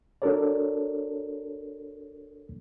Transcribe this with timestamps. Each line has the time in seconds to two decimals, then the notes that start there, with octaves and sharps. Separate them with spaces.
0.22 D4 F#4 A4 A#4 C#5 D5